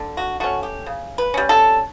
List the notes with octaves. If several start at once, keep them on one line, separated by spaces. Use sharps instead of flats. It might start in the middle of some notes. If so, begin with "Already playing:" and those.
Already playing: D3
F#4
A3 C#4 F#4
G4
C#3
B4
G3 C#4
A4